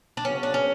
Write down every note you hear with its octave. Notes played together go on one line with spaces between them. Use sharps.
D4
C#3 F#3 B3 C#4
D4
C#4